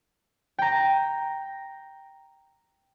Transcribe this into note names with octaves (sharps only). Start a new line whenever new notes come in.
G5 A#5